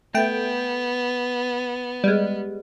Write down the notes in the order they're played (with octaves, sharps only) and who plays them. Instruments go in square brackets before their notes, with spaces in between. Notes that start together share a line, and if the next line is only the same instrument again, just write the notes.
[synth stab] A3 G5 [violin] B3
[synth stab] G3 G#3